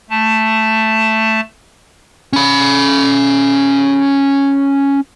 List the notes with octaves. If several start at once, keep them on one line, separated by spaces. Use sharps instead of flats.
A3 A5
C#4 B5